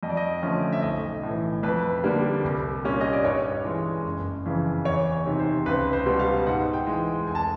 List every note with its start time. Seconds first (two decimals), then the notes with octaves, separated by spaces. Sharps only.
0.03 F2 D#5
0.10 D5
0.17 D#5
0.42 D3 F3 A3 C#4
0.72 E5
0.82 B1 D#5
1.23 A2 E3
1.63 F2 B4
2.04 D3 G3 A#3 D4
2.44 C2
2.84 A#2 G3 A#3 C#4
3.01 D#5
3.13 D5
3.24 G2 C#5
3.65 E3 G#3
4.05 F#1
4.46 F2 C#3 E3
4.85 E2 C#5
5.12 C#5
5.25 C3 D#3
5.40 C5
5.66 C#2 B4
5.93 C5
6.06 B2 G3 B3
6.19 F5
6.46 G#2 F#5
6.73 G5
6.87 E3 G#3
7.27 F1 G#5
7.35 A5